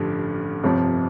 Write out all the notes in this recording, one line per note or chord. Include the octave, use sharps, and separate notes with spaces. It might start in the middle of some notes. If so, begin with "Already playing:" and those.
Already playing: A1 G2 D3 F3
G1 F2 C3 F3